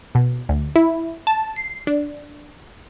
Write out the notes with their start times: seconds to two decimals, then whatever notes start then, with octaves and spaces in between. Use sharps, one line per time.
0.15 B2
0.49 D2
0.76 E4
1.27 A5
1.56 C7
1.87 D4